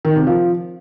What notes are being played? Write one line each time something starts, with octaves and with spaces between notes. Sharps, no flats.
D#3
C3
F3